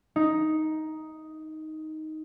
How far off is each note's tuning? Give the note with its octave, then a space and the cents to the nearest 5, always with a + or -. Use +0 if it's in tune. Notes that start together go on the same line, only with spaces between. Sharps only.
D#4 +5